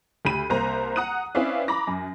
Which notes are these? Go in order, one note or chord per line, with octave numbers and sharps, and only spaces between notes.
D2 G4 B5 D#7
C2 A#3 C5 A#5
F#5 A#5 D#6 F#6 D#7
C4 C#4 E4 B4 D5 F5
A#5 B5 D6 A#6
F#2